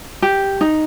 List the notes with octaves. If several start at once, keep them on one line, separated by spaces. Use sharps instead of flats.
G4
D#4